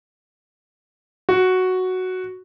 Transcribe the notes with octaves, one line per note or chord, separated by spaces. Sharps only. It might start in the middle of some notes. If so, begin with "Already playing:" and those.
F#4